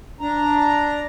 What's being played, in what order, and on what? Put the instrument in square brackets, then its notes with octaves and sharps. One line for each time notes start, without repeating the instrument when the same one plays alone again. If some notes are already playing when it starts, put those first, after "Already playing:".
[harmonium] D4 A#5